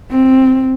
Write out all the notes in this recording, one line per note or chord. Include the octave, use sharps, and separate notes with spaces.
C4